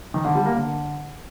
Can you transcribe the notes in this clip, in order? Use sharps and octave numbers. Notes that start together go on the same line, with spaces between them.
D#3
D3
G3
A#3
D3